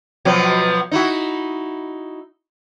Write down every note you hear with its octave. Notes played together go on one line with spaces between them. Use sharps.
B2 F3 F#3
D#4 E4 F#4